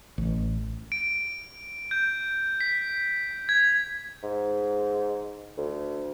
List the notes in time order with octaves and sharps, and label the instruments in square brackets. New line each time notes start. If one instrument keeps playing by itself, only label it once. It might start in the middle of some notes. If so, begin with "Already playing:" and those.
[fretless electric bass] A1
[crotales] D7
G6
B6
G#6
[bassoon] G#2
D2